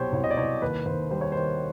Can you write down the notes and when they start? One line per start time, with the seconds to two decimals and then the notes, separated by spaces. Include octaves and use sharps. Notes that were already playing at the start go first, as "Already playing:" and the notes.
Already playing: C2 B2 F#3 G4 C5 C#5
0.12 C2 C#5
0.24 D#5
0.31 D5
0.37 C2 C#5
0.62 D#2 B4
0.86 D#2 C5
1.11 G3 C5
1.21 C#5
1.32 D#3 C5